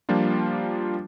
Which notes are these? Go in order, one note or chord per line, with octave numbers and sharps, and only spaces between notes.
F3 G3 A#3 D4 F4